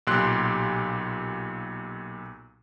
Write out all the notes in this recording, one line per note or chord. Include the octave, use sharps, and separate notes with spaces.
B1 A#2 G4 C6 F#6